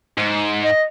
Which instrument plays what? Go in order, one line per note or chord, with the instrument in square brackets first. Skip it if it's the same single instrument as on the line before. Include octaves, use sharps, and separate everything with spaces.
[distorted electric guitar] G#2
[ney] D#5